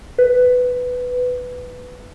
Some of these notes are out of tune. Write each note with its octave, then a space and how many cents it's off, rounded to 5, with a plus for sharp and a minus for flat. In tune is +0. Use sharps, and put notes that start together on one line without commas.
B4 +10